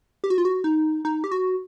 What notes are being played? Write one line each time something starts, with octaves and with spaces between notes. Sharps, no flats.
G4
F#4
F4
F#4
D#4
D#4
G4
F#4